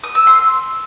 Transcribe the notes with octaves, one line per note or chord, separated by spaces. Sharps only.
D#6
E6
C6